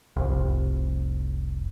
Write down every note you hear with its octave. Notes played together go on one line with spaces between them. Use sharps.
F1 C2